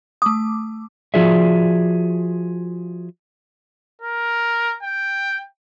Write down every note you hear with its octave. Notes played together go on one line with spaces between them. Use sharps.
A3 D6 D#6
F3 F4 F#4 G#4 D5 E5
A#4
G5